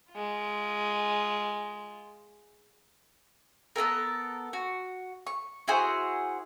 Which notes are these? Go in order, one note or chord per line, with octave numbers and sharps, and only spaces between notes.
G#3 F4
B3 D4 A4 A#4
F#4
C#6
E4 F#4 G#4 C5